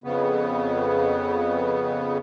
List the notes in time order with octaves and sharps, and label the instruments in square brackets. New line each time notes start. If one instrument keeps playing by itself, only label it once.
[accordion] F2 C#3 B3